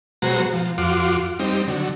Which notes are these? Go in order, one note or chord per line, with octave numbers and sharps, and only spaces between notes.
B2 F#3 G#3 F#4 C5 A#5
F3
F2 F4 F#4 C6 D6
G3 C4 D#4
D3 F#3